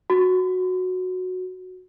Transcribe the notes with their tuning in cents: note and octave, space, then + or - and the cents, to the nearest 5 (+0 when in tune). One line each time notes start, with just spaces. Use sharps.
F#4 -10